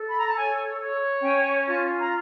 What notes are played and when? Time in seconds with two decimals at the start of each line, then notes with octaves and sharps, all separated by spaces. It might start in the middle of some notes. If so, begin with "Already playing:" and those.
Already playing: A4
0.08 B5
0.17 A#5
0.27 A5
0.35 C#5 G#5
0.79 C#5
1.22 C#4 G5
1.65 F4 A5
1.98 A#5